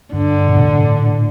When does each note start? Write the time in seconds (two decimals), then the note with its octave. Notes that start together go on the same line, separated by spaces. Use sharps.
0.13 G2 D3
0.48 B2
0.57 A2